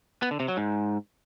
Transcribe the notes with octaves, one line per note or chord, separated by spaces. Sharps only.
B3
D3
C3
F#3
G#2